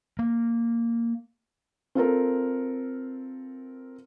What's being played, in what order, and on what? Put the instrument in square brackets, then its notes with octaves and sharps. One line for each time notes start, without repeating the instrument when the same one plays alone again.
[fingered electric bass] A#3
[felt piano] C4 F4 A4 A#4